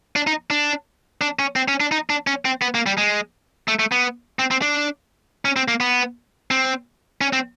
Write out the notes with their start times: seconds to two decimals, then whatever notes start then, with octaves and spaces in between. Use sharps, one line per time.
0.16 D4
0.27 D#4
0.50 D4
1.21 D4
1.39 C#4
1.56 C4
1.68 C#4
1.80 D4
1.92 D#4
2.10 D4
2.27 C#4
2.45 C4
2.62 B3
2.75 A#3
2.86 G3
2.98 G#3
3.68 A3
3.79 A3
3.92 B3
4.39 C4
4.51 C4
4.62 D4
5.45 C#4
5.56 C4
5.68 A#3
5.80 B3
6.51 C4
7.21 C#4
7.33 C4